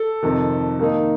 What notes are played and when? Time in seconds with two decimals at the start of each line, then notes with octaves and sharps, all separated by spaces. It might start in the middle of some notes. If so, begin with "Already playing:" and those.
Already playing: A4
0.23 F2 C3 D#3
0.79 D#3 A#3 D#4